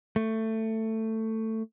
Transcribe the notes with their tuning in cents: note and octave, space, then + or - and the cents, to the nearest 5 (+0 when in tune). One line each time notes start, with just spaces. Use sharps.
A3 +15